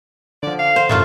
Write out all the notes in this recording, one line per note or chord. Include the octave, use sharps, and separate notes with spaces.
D3 F3 D5
F5
C5
F#2 A2 C3 A3 D4 F4